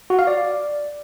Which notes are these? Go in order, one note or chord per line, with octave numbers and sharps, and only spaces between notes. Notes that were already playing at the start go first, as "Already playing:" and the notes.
F#4
F5
D5